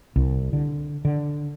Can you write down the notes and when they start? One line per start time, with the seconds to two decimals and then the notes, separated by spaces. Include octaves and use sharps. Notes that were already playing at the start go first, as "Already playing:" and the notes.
0.16 C2
0.53 D3
1.05 D3